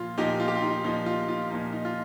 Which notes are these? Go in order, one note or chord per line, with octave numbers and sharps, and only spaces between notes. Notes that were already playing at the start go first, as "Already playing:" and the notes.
Already playing: A#2 F3 F4
A#2 F3 D#4 G4
F4
G4
F4
D#4
A#2 F3 D#4
F4
F4
A#2 F3 D#4
D#4
F4